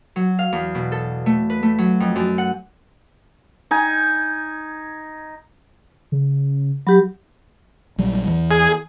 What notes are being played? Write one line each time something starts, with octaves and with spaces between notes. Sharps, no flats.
F#3
F5
E2
B2
A4
A3
B4
A3
F#3
F2
F#2
F#5
D#4 G#5
C#3
F#3 G4 B5
A#1 F#3 G3
E2 E3
G#4